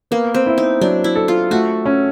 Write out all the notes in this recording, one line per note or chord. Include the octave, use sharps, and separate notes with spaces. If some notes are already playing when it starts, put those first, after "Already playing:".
A#3 B3
C4
E4
D#4
F#3 D4
E4
A4
F4
A3 F#4
C#4